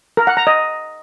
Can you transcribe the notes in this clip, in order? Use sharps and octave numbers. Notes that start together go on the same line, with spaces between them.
A#4
F#5
A#5
D#5